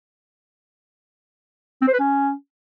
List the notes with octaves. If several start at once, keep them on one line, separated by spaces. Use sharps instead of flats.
C4
C5
B4
C#4